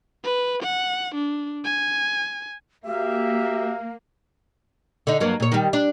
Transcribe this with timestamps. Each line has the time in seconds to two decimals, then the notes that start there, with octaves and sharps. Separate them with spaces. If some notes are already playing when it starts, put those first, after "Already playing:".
0.24 B4
0.63 F#5
1.15 D4
1.65 G#5
2.85 A#3 F#4 G4 E5 F5
5.07 D3 D#4
5.20 G2 F#3 A#3
5.40 A#2 C#5
5.52 D#3 G3
5.73 D4